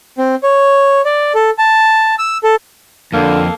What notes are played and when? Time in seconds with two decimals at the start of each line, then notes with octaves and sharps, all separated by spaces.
0.18 C4
0.43 C#5
1.05 D5
1.35 A4
1.58 A5
2.18 E6
2.44 A4
3.13 F2 D3 A#3 A4 F5